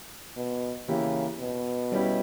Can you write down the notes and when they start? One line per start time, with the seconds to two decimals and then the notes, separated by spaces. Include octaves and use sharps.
0.37 B2
0.88 C#3 E3 A#3 E4 G4
1.40 B2
1.92 G3 C#4 E4 G4